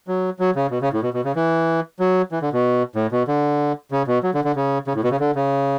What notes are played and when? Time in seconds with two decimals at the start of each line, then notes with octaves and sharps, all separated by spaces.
0.08 F#3
0.39 F#3
0.56 C#3
0.71 B2
0.81 C#3
0.93 A2
1.03 B2
1.14 B2
1.25 C#3
1.36 E3
2.00 F#3
2.32 E3
2.42 D3
2.53 B2
2.95 A2
3.12 B2
3.28 D3
3.91 C#3
4.07 B2
4.23 F#3
4.34 D3
4.44 D3
4.56 C#3
4.87 C#3
4.95 A2
5.04 B2
5.11 C#3
5.20 D3
5.35 C#3